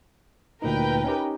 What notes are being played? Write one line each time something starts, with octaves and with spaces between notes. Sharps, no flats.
D2 A#2 D#4 A#4 B4 G5
C#4 D#4 G4